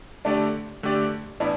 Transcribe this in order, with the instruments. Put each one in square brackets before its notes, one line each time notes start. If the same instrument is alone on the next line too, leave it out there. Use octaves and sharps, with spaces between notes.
[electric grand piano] D3 A3 G4 D5 [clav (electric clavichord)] D4
[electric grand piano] D3 A3 G4 D5
[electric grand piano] A2 E3 B3 E4 [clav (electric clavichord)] D4